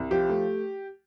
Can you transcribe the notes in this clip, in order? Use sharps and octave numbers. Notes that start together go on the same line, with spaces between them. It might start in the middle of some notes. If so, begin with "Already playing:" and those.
Already playing: C2
F3 G4
A3